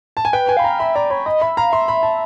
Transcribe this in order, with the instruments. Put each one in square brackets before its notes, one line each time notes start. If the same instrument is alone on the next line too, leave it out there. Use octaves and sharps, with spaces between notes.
[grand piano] A5
G#5
[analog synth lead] B4 [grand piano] G5
[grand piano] G#5
[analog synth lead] F5 [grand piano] B5
[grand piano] A#5
[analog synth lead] E5 [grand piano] B5
[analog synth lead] D5 [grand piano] A#5
[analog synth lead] C#5 [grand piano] B5
[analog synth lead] D#5 [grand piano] B5
[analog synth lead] E5 [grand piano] B5
[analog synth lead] F5 [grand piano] A#5
[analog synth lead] E5 [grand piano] C6
[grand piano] B5
A5